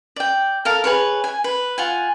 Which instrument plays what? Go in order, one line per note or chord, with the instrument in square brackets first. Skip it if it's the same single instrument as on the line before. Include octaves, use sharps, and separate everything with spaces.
[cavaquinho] D5 G5
A4 A#4 F5
G#4 B4 C#5
G#5
B4
F4 F#5 G#5